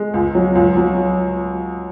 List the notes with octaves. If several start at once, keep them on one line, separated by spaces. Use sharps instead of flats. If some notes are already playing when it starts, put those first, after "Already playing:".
Already playing: G#3
C#2
F#3
C#2
F#3